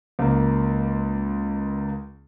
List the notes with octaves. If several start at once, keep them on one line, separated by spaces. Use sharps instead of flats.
C#2 A#3